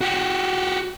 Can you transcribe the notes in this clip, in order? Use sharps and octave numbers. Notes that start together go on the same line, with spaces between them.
F#4 G4